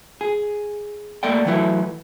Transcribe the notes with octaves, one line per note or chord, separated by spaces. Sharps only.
G#4
A3 A#3 A4 D5 G5
E3 F#3 A3 E4 B4